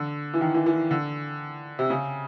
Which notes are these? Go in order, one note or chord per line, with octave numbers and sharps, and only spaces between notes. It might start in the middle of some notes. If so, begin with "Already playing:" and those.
Already playing: D3
E3
D#3
E3
E3
D3
C3
C#3